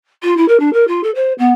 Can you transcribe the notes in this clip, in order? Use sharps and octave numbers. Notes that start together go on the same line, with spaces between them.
F4
E4
A#4
D4
A#4
F4
A4
C5
B3